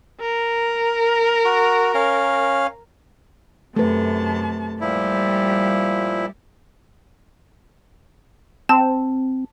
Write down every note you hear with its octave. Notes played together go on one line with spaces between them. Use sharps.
A#4
F#4
C#4 F5
F#2 C3 A3 B4 A5
A#2 F3 G3 E4 G4
C4 A5